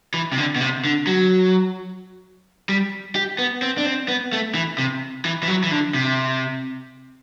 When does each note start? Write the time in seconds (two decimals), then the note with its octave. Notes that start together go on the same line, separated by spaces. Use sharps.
0.14 E3
0.33 C3
0.38 D3
0.56 B2
0.61 C3
0.85 D3
1.07 F#3
2.69 G3
3.15 G4
3.39 B3
3.62 C4
3.78 D4
3.86 C4
4.08 B3
4.33 A3
4.55 E3
4.78 C3
5.25 E3
5.43 E3
5.48 F#3
5.64 E3
5.71 D3
5.94 C3